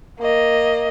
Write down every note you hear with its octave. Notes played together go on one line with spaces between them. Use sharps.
A#3 D#5